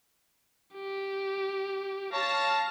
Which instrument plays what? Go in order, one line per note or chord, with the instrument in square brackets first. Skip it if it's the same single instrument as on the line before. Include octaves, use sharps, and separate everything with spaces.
[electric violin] G4
[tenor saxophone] C#5 [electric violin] F5 A#6 [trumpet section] A5